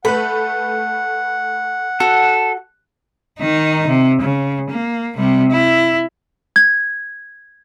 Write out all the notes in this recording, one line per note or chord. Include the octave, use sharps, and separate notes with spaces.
A3 B4 F#5 B5
F#4 A4
D#3 D#4
C3
C#3
A#3
C3 G3
E4
G#6